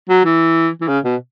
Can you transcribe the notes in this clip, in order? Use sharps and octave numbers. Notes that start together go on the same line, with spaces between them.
F#3
E3
E3
C#3
B2